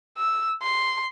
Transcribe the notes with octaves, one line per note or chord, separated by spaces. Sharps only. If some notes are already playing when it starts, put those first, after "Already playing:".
E6
C6